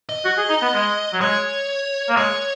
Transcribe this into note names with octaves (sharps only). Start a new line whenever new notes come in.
D#5
F#4
G#4
D#4
B3
G#3
F#3
G#3 C#5
A#3
G#3 C#5